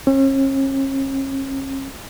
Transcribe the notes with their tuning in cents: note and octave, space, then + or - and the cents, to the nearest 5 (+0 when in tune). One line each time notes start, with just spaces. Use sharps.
C#4 -40